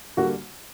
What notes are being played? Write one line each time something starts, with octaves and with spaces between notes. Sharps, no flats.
D3 G3 A#3 F#4